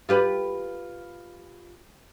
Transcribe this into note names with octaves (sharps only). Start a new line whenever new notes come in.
F4 G4 B4